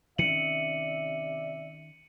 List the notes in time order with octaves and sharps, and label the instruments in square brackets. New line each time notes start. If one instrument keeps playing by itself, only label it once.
[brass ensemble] C3 D5 E5 [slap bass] D#3 C#4 [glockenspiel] C#7 D#7 F#7